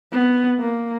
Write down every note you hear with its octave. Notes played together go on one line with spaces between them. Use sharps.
B3
A#3